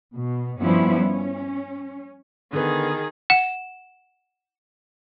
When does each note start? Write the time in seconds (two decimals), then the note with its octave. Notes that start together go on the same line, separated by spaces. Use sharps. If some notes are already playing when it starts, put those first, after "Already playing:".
0.16 B2
0.60 G2 F3 G3 B3 C#4 E4
0.96 C#4
2.53 D3 D#3 B3 G#4
3.30 F#5 E7